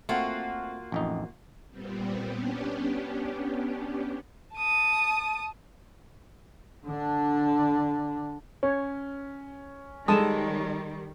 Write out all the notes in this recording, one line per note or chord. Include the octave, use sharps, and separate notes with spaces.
A3 A#3 C4 F4 F#4
A1 F2 D#4
A#2 G3 B3 C4
B3 C#4 D4 G4
A5 D#6
D3 D4
C#4 C#5
D#3 G3 G#3 A4 A5 D#6